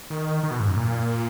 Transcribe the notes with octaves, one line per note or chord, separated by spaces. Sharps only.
D#3
D#3
B2
G#2
F#2
A#2